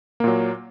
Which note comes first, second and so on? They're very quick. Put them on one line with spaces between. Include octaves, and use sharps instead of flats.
A#3 A#2 F#3